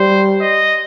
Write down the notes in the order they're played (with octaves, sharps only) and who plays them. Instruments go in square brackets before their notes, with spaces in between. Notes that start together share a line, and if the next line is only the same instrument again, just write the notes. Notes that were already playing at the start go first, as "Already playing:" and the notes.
Already playing: [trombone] G3 [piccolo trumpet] C5
[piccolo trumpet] D#5